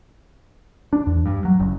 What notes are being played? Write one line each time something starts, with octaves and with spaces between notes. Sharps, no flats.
D4
E2
G2
F#3
F#1